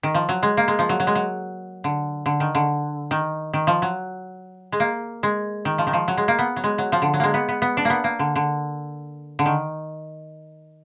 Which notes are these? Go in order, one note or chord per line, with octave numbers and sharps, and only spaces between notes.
D#3
F3
F#3
G#3
A#3
G#3
F3
F#3
F#3
G#3
F#3
D3
D3
D#3
D3
D#3
D#3
F3
F#3
G#3
A#3
G#3
D#3
F3
D#3
F3
F#3
G#3
A#3
B3
F#3
G#3
F#3
F3
D3
F#3
G#3 A#3
B3
B3
B3
D4
A#3 B3
A#3
D3
D3
D3
D#3